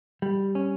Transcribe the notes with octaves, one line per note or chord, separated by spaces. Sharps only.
G3
C#4